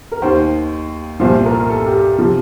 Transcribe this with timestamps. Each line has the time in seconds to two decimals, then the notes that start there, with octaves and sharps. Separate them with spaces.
0.12 A#4
0.22 D#2 D#3 C5
1.20 C2 A#2 F3 C5
1.45 A#4
1.69 A4
1.87 G4
2.18 C3 F3 F4